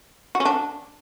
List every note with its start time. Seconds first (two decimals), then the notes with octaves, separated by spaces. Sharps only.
0.35 F#4
0.40 C#4
0.45 D4